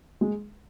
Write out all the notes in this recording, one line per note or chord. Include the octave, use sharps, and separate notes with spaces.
G#3